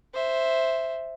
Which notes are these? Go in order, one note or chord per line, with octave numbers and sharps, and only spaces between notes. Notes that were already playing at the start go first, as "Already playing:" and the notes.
C5 E5